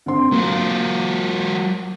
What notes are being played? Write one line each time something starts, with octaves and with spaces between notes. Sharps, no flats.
D3 C4 C6
F#3 A#3 F4